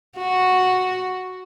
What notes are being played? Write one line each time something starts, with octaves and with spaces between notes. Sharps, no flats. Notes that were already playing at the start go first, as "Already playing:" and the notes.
F#4